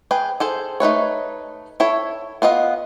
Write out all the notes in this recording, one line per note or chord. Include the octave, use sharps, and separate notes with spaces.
G#4 B4 G5
G#4 A4 C5
A3 D#4 B4 C#5
E4 A4 C#5
B3 F4 D#5 F5